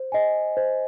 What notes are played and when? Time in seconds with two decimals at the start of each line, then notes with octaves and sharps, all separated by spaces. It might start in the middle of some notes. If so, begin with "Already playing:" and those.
Already playing: C5
0.12 D#5 G#5
0.57 C5